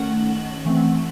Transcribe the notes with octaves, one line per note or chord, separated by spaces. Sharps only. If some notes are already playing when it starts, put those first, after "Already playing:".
Already playing: D#3 A3 C#4 F#5
E3 A3 C4